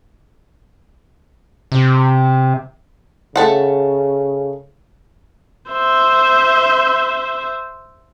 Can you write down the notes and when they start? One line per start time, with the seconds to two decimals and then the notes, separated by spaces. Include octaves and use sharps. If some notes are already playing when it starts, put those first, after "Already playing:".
1.72 C3
3.36 C#3 A3 A4 F#5
5.71 C5 E5